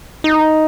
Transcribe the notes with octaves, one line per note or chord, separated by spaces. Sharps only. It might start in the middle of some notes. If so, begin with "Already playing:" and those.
D#4